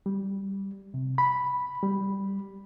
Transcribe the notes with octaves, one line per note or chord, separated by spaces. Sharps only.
G3
C3
B5
G3